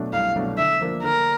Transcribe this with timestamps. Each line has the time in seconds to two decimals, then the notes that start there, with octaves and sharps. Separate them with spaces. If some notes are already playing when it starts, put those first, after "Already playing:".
Already playing: B2 F#3 A3 D4
0.12 C2 F5
0.36 B2 F#3 A3 D4
0.58 D3 E5
0.80 F3 A#3 D4
1.03 D3 A#4